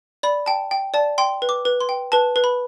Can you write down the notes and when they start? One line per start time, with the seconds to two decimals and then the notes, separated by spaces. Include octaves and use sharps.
0.23 D5 B5
0.46 G5 A5
0.71 G5
0.94 D5 A5
1.18 G5 C6
1.42 B4
1.49 D6
1.65 B4
1.81 C6
1.89 G5
2.12 B4 A5
2.36 B4
2.44 B5